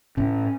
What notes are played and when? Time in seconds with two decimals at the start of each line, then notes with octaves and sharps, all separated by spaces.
0.17 A2 C#4